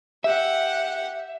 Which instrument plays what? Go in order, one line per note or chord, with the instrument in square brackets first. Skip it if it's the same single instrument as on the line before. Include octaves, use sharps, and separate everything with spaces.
[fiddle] G4 F#5 [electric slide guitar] E5